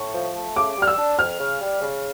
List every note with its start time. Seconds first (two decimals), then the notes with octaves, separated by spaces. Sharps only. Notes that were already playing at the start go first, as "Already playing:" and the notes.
Already playing: A2 C#6
0.14 F3
0.35 A3
0.56 C#3 D6
0.77 G3
0.82 F6
0.87 E6
0.97 D4
1.18 F2 F6
1.39 C#3
1.60 G3
1.81 C#3